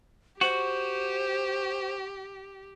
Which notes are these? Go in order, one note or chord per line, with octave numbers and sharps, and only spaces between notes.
F#4 G4 C5